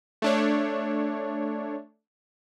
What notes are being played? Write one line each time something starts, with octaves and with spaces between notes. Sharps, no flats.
A3 D4 C#5